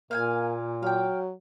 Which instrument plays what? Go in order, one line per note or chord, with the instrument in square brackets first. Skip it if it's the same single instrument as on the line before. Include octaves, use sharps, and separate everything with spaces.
[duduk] A#2 [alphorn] A#3 [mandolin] F5 G5 G#5
[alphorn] F#3 [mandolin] F5 G5